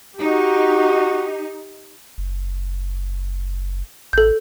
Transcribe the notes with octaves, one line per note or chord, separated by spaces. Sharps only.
D#4 F#4 G4
F#1
A1 A4 G6